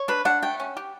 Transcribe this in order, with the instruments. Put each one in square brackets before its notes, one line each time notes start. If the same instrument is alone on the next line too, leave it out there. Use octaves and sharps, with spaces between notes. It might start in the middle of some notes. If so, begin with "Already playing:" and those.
Already playing: [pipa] C#5
[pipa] D4 [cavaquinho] B4
[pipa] D4 [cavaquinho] F#5
[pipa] A3 [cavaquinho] G5
[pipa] C#4
G4